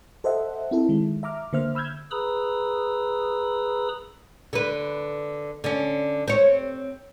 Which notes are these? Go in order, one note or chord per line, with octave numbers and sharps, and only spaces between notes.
A4 C5 D#5 E5 F#5
C4 E4 A4
D#3 G#3
E5 A#5 D6 F6
D3 A#3 C5 E5 F6
B5 E6 F6 G6 G#6
G#4 B4 A#5 B5 D#6 E6
D3 B4
D3 C#4
C4 C#5